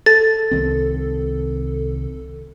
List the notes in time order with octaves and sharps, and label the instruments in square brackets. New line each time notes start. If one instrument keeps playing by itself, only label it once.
[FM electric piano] A4 [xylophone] A6
[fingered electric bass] C2 D#3 C4